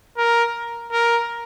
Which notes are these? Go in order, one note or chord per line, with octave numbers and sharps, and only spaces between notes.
A#4
A#4